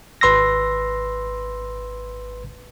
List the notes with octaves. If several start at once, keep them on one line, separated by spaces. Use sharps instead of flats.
G#1 B4 C6 E6 A#6